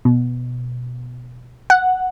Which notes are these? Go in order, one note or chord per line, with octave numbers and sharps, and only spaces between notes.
B2
F#5